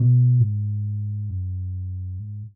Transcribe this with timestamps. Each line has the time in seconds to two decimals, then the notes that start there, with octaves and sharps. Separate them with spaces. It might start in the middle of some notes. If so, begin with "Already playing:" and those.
Already playing: B2
0.40 G#2
1.30 F#2
2.19 G#2